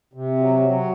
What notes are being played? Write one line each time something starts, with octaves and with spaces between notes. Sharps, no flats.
C3
F#3
F#3